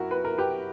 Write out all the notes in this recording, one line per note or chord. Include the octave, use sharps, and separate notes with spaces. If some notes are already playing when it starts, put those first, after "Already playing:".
Already playing: F#2 E4 F#4 A#4
B4
A#4
G4 B4